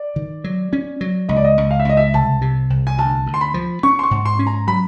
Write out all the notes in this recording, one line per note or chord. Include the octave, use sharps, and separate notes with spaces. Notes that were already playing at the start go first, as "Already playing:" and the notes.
Already playing: D5
D#3
F#3
C#4
F#3
C#2 D#5
D5
D#5
C#2
F5
E5
C#2 D#5
E5
C2 A5
C3
C2
G#5
D2 A5
D2
C6
B5
F3
C#4 C#6
C6
C#6
G#2
C6
C#4
A#5
F#3 B5